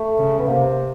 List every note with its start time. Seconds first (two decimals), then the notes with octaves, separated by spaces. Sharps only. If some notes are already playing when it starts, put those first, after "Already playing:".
Already playing: A3
0.18 C#3
0.39 B3
0.48 C3 A#3